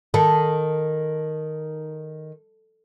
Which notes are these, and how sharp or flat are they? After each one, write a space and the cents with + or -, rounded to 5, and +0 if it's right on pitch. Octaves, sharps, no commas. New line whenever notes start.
D#3 +0 A4 +0